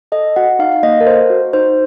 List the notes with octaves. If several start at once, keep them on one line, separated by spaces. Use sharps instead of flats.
A4 D#5
F#4 F#5
D#4 F5
F5
A#3 D#5
A#4
A4 C5
F#4
D#4 C5